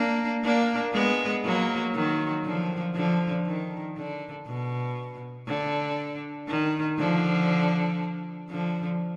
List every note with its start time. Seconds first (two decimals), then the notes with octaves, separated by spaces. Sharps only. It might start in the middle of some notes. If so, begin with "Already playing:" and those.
Already playing: A#3 D4
0.43 A#3 D4
0.93 G#3 B3
1.44 F#3 A#3
1.95 D#3 F#3
2.45 D3 F3
2.95 D3 F3
3.46 D#3
3.97 D3
4.47 B2
5.47 D3
6.48 D#3
6.99 D3 F3
8.50 D3 F3